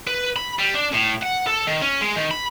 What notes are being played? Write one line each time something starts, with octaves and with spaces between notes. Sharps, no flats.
B4
B5
G3
D4
A2
F#5
A4
D#3
C#4
G#3
D#3
B5